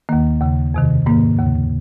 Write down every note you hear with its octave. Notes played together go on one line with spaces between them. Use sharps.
D#2 D#3 A#3
D#2 C#3
F2 C3 D#3
G#2 D#3 A#3
D#2 C#3